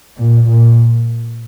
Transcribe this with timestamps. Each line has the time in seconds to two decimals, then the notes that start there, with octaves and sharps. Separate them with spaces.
0.18 A#2
0.48 A#2